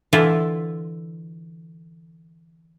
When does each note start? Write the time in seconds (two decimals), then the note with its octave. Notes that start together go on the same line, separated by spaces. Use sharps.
0.13 D3 E3 E4 F4